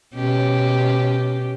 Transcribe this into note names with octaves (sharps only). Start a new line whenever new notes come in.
B2 C#4 G4